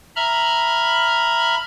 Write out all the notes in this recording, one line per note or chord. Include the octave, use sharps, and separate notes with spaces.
E5 A#5 B5 F6